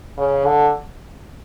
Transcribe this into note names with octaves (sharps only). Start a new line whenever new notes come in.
C#3
D3